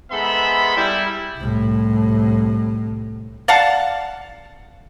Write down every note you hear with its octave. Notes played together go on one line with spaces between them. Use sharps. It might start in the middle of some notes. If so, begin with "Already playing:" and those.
G#2 G#3 B3 A4 E5 B5
G3 E4
C2 A2
D5 F5 F#5 A5